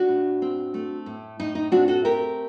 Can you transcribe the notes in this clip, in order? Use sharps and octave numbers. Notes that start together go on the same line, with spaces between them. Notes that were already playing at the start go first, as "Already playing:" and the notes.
Already playing: D4 F#4
A2
C4
A3
A2
A2 D#4
D#4
C4 D4 F#4
F#4 A4
A3 G4 A#4